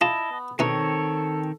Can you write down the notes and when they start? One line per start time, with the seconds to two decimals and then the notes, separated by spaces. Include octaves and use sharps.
0.01 E4 F4 D#5 A5
0.32 B3
0.59 B2 D#3 C4 D#4 A4 C#5